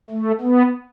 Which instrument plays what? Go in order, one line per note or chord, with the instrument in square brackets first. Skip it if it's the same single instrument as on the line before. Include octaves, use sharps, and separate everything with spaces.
[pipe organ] A3
B3